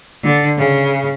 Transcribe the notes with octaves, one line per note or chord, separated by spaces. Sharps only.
D3
C#3